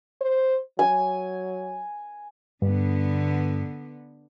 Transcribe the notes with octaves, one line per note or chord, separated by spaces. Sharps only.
C5
F#3 G#5
G2 D3 B3